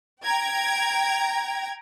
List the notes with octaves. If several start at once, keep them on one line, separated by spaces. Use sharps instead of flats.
G5 A#5 G#6